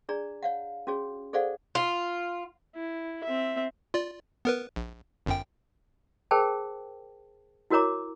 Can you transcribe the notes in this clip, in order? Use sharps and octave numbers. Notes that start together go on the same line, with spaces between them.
D4 G#4 D5 A#5
C#5 F5 F#5
C#4 F#4 G#4 C#5
G#4 A4 C5 D5 F5 F#5
F4
E4
C4 E5
F4 D5
B3 A#4 B4
A#1
G1 F#2 G5
G#4 A#4 C5 G5 A5
E4 F#4 A#4 C#5 A#5 D6